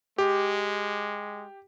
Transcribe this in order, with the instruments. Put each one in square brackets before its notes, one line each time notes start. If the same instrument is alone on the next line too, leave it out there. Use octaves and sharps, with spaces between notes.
[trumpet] G#3 [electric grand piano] G4